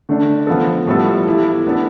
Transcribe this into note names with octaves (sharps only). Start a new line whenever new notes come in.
D3 A3 D4
F3 B3 F4 A4
A2 G3 B3 F4 A4
E3 A3 E4 G4
E3 B3 D4 A4